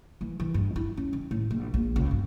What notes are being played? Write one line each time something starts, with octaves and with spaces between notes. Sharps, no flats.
E3
E3
G2
E4
C#4
D#3
A2
A#1
A#1
C#2
G2